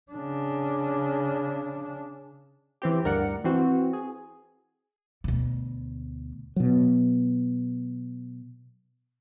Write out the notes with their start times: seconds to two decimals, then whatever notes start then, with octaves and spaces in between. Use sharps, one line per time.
0.12 C#3 D4
2.82 E3 C4 G4
3.04 D2 G2 A#4 D5 F#5 C#7
3.44 E3 C4 F#4
3.93 G#4
5.24 D2 B2
6.56 B2 F#3